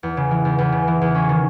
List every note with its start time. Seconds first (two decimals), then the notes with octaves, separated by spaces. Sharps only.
0.03 E2
0.17 C#3
0.31 E3
0.45 E2
0.59 E2
0.72 C#3
0.88 E3
1.01 E2
1.15 C#4
1.29 D#3